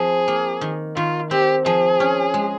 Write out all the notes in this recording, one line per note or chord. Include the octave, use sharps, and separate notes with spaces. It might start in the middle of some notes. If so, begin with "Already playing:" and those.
Already playing: F3 C4 G#4
A#3
D#3
D#3 F4
C4 G4
F3 G#4
C#4
G#3